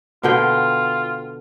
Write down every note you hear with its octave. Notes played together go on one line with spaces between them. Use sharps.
B2 D3 F4 G5